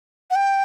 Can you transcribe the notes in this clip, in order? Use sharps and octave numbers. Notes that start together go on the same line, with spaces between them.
F#5
G5